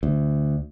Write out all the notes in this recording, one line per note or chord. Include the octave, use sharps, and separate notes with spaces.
D2